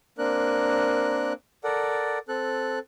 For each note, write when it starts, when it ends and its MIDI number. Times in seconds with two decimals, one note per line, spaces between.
0.18 1.33 58
0.18 1.33 60
0.18 1.33 62
0.18 1.33 70
0.18 1.33 90
1.64 2.19 69
1.64 2.19 70
1.64 2.19 74
1.64 2.19 78
2.28 2.79 60
2.28 2.79 69
2.28 2.79 90